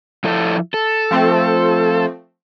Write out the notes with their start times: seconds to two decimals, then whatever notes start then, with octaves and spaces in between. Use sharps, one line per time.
0.24 F3 E4 A4
0.74 A4
1.11 F3 A3 C4